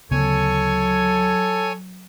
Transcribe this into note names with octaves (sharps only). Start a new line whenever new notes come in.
D2 C#3 F#3 B3 A4 C#5 G#5